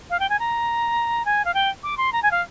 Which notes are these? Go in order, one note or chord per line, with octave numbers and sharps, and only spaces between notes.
F5
G5
G#5
A#5
G#5
F5
G5
D6
C6
A#5
G#5
F5